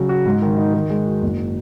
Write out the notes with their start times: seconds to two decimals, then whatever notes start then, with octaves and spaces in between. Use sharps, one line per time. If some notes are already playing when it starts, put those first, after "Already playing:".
Already playing: C#3 F#3
0.09 F#4
0.26 G#2
0.42 D#3
0.58 D#4
0.74 D#3
0.90 G#3
1.06 F#4
1.22 F#1